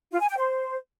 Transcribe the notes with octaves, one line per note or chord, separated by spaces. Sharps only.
F4
G#5
G5
C5